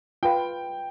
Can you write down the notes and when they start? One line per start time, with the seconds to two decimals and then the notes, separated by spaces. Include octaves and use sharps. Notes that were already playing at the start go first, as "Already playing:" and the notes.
0.23 F4 B4 F5 G5